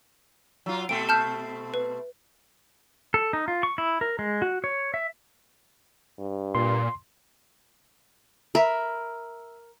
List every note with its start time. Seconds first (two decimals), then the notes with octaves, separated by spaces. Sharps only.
0.66 F#3 F4
0.89 B2 A3 C4 D7
1.09 A5 F6 G6
1.74 B4
3.14 A4
3.33 D#4
3.48 F4
3.63 C#6
3.78 E4
4.01 A#4
4.19 G#3
4.42 F#4
4.64 C#5
4.94 E5
6.19 G2
6.55 A#2 C6
8.55 A#4 E5 B5